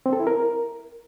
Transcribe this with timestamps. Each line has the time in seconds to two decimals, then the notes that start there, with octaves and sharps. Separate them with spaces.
0.06 C4
0.13 A4
0.20 E4
0.27 A#4